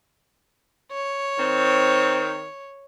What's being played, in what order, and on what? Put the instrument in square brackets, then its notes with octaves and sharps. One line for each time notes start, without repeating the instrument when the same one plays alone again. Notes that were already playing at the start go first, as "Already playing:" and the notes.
[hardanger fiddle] C#5
[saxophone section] D#3 C4